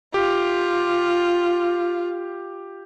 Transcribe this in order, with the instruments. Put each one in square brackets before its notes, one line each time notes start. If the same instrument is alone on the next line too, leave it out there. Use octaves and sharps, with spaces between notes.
[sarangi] F4 [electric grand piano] G4